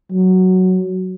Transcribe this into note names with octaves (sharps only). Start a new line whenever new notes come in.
F#3